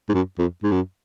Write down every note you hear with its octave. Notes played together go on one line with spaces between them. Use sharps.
G#2
F#2
F2
G#2
F#2